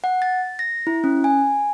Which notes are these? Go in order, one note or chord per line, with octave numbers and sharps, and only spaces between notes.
F#5
A6
A#6
E4
C#4
G#5